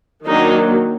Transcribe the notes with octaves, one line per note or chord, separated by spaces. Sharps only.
D#3 F#3 A#3 D4 D#4